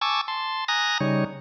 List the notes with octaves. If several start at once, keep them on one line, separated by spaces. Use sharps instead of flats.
G#5 A5 C#6 D6 E6
A5 C6
G#5 A#5 D#6 F#6 A#6
C#3 G3 D#4 C#5